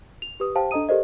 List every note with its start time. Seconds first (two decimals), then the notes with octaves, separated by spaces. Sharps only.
0.22 F7
0.40 G4 B4 D#6
0.55 G4 C5 F5 G5 A5
0.71 D4 A4 D#5 A#5 D#6 D#7
0.89 G4 A4 A#4 C5 D5 D#5